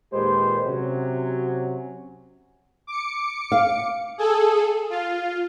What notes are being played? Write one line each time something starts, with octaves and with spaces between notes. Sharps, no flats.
D#2 A#2 G#3 G4 B4 C5
C3 F#3 C#4
D6 C#7
F5
G#4 A4
F4